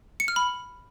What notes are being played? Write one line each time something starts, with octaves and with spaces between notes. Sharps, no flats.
C#7
F6
B5